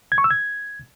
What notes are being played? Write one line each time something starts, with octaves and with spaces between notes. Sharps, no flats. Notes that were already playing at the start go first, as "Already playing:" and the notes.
G#6
C#6
E6
G#6